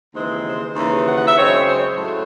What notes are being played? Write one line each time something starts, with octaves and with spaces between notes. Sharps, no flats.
D#2 C#3 E3 G#3 C4 C5
C5
D#2 C#3 E3
F#5
F#5
E5
F#2 C#3 G#3 C4 C#5
C5
C#5
C5
A2 F#3 A3